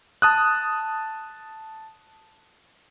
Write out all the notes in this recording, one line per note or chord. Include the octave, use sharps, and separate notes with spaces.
A5 D#6 F#6